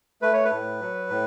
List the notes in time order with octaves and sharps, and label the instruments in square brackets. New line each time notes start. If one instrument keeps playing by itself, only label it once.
[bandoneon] A3 B4
C#5
B4
A2
F#3
A2